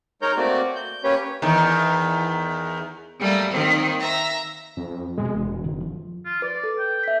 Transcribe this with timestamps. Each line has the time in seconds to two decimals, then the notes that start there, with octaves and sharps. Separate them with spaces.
0.22 G#3 D#4 A#4 C#5 A#5 G6
0.37 A3 A#3 C4 F#4 D5
0.76 G6
1.04 A#3 C#4 G4 B4 C#5
1.42 E2 D#3
3.20 G3 A3 A#3
3.50 D#3 A#3 C4
3.99 E5 A#5
4.77 F2
5.17 F1 G#2 B2 G#3
5.35 E1
5.64 F#1 D#3
5.80 F3
6.25 F4
6.42 B4 D5
6.64 A4
6.79 G5
7.04 E5 B6